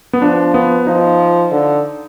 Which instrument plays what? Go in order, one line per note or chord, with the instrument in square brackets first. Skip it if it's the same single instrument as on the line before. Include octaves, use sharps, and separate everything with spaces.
[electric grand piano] B3
[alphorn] F3 [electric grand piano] D4
[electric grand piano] B3
[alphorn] F3 [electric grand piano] D#4
[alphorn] D3